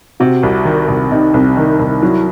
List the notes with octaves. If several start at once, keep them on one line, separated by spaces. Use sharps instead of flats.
C3 F#4
C2
D#3
C2
C3 D#4
C2 C4
D#3 D#4
C2 D#4
F#3 E4